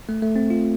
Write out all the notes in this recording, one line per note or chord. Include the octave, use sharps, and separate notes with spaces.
A3
A3
C4
F4